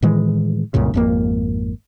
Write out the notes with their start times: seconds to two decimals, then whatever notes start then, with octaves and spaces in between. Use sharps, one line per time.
0.02 A2 D#3 E3 G#3
0.74 C2 F#2 A#2 C#3
0.94 G#1 F2 A#3